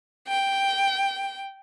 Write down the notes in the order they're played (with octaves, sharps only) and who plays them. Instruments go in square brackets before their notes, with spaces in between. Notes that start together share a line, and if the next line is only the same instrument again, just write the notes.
[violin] G5